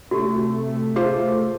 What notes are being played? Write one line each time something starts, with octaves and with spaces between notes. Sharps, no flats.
C3 A3 F#4 G4
F4 G#4 C5